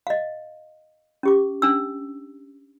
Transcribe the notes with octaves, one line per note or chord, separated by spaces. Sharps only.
D#5 F5
C#4 G4 D6
C#4 D4 E6